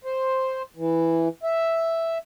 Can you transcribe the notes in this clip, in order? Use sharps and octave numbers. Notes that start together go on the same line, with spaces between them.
C5
E3
E5